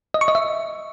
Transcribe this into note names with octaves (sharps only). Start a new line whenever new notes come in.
D#5
C#6
D#5
E5